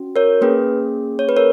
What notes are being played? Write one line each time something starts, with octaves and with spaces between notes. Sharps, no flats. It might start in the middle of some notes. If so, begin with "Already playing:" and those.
Already playing: C#4 F#4
A#4 C#5
A#3 C#4 G#4 B4
C#5
B4
A#4 C#5